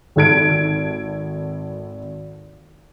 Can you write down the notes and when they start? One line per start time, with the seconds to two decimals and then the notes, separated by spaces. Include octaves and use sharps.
0.16 G#1 A4 G#6 D7